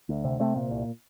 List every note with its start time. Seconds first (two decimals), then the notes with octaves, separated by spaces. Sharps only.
0.09 D2
0.24 C3
0.40 C3 A3 C4
0.56 A#2
0.71 C2